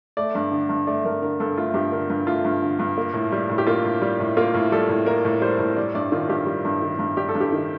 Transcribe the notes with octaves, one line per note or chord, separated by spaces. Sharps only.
A3 D5
G2
D3
G2
A3 D5
G2 A#4
D3 A#4
G2 A4
A3 F4
G2 G4
D3 A#4
G2
A3 F4
G2
D3
G2
A#3
A2
G3
A2
G4
A#3 F4
A2
G3
A2
A#3 F4
A2
G3 A4
A2
A#3 A#4
A2
G3 C5
A2
G3 D5
G2 D5
D#3 F4
G2 G4
G3
G2
D#3
G2
G3 G4
A4
G2
G4
D#3